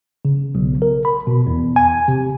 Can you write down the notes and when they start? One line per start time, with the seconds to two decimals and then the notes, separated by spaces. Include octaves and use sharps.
0.25 C#3
0.55 B1
0.82 A#4
1.05 B5
1.27 B2
1.47 E2
1.76 G#5
2.08 C3